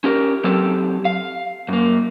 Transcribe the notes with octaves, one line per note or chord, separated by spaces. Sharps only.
C#4 G4 A#4
F#3 C4 G4 A4
F5
F#2 A#3